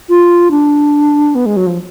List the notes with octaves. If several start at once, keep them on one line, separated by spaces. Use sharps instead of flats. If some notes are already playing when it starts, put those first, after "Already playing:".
F4
D4
B3
G#3
F#3
F3